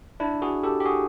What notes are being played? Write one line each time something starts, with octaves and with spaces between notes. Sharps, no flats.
D4 E4
F#4 G#4
G4 A4
G4
F#4 G#4